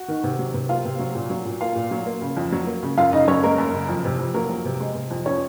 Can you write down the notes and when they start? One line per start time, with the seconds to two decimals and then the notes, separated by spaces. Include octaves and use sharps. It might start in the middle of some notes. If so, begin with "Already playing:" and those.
Already playing: F#4
0.08 D#3
0.24 C3
0.39 F#3
0.54 C3
0.69 A#3 F4 F5
0.85 C3
0.99 F#3
1.15 A#2
1.30 F#3
1.45 A#2
1.61 A#3 F4 F5
1.75 A#2
1.91 F#3
2.06 A#3
2.22 C#3
2.37 F2
2.52 F#3
2.67 A#3
2.83 C#3
2.97 F#2 F4 F5
3.13 C#3 D#4 D#5
3.28 F#2 C#4 C#5
3.43 G#3 A#3 A#4
3.58 F#2
3.74 C#3
3.89 F2
4.05 C3
4.19 F2
4.34 F#3 A#3 A#4
4.49 F2
4.65 C3
4.80 G#3
4.95 C3
5.11 F2
5.26 F3 C#4 C#5